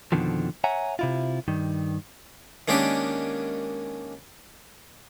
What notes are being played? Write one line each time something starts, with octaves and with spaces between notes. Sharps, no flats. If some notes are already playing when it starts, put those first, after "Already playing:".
F2 B2 D3 D#3 F3
C#5 E5 F#5 G#5 A#5
C3 E4 F4
G2 D#3
D#3 G#3 A#3 C#4 D4 G4